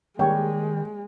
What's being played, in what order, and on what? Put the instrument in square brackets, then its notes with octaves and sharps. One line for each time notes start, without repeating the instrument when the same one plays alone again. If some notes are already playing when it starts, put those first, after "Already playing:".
[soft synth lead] D#3 [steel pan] G3 A#3 C#5 [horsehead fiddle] G#3 [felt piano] G5